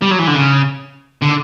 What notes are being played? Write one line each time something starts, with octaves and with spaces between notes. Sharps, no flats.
G3
F#3
E3
D3
C#3
D3